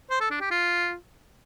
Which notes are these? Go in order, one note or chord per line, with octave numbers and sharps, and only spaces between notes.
C5
A4
D4
G4
F4